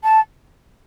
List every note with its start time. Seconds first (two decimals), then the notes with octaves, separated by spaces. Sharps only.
0.02 A5